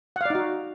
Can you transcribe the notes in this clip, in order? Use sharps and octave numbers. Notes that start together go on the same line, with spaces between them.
D#4 F#4 D5 F5 F#5